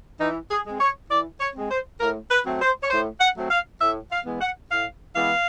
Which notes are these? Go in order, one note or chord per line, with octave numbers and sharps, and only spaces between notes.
E3 D#4
G#4
G#3 C4
C#5
E3 D5
C#5
G#3 C4
C5
A2 A#4
B4
F#3 A3 C4
C5
C#5
A2 C5
F#5
F#3 A3 C4
F5
A2 E5
F5
E3 G#3 B3
F#5
A2 F5
E3 G#3 B3 F5